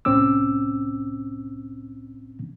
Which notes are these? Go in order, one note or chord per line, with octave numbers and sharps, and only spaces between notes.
C2 A2 C4 C#4 D6 E6